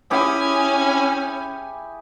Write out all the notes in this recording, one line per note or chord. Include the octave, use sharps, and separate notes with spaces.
C#4 E4 G4 G#4 G#5